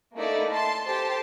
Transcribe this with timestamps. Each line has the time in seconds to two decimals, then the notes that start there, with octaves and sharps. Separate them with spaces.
0.15 A3 A#3 D#4 E4 A4 D5
0.51 A5 C6
0.86 G4 A4 C5 A5 C6